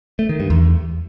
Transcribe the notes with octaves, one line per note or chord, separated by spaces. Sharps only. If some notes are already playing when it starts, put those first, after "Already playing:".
A3
D#3
G2
E2